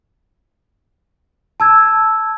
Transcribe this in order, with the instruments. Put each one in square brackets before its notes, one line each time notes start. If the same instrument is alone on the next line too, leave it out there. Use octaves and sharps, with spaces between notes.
[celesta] A5 E6 G#6